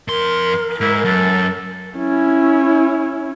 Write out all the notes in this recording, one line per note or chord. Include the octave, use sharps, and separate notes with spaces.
F2 A#4 C6
G#2 E4
F#2 A4
C#4 E4